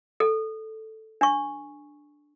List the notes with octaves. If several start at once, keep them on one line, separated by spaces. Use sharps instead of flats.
A4
D4 C#6